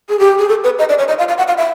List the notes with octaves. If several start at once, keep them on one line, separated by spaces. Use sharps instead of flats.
G#4
G4
G#4
A4
B4
D#5
D5
C#5
D#5
F5
F5
F#5
F5
E5